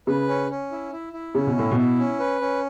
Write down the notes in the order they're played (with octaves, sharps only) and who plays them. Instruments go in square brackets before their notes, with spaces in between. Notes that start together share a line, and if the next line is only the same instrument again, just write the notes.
[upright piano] C#3 [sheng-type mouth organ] B4
[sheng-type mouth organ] C#4
C#4
E4
E4
E4
[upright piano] C#3 [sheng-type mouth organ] C#4
[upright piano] B2
[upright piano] A2 [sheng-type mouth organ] E4
[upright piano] B2
[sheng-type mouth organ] E4
C#4
B4
C#4